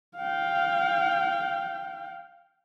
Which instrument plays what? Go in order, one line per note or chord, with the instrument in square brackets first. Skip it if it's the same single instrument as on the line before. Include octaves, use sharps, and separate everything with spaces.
[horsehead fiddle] F5 G5